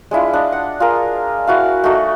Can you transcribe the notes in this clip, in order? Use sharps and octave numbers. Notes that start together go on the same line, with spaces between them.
G#3 D4 E4 F4
D4 D#5
F#5
F4 G#4 A#4
E4 F#4 F5
A3 D#4 F#4 D#5